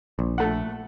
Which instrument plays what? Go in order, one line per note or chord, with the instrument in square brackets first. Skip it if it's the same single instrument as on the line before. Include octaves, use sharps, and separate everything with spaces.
[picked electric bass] A#1
[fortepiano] A3 F#5